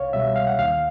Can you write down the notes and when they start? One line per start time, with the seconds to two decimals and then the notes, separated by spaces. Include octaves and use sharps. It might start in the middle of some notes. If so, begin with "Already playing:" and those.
Already playing: C2 C#5 F5
0.13 B2 G3 E5
0.36 F5
0.47 F#5
0.59 D#2 F5